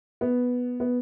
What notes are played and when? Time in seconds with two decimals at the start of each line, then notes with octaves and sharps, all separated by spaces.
0.21 B3
0.80 B3